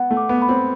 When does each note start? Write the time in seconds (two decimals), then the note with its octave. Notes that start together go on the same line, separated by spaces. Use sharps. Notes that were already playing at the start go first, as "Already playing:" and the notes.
Already playing: B3 F#5
0.11 A3
0.17 D6
0.29 B3
0.42 B5
0.49 C4